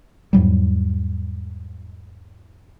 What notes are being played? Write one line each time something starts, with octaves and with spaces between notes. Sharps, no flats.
E2 G#2 F#3 G3